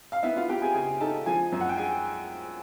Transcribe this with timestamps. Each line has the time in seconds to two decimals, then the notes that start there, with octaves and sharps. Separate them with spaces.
0.12 F5
0.23 B3 E4 E5
0.36 F4 F5
0.49 B3 G4 G5
0.62 G#4 G#5
0.74 C#3 G#4 G#5
1.00 D#4 A4 A5
1.26 F3 G#4 G#5
1.52 F#2
1.61 F#5
1.69 G5
1.77 G#4 G#5